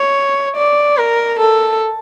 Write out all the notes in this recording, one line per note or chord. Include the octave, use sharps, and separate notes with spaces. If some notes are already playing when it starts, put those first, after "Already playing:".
Already playing: C#5
D5
A#4
A4